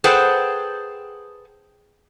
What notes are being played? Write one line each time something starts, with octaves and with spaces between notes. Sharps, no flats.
G#4 A4 B4 C5 F#5 G5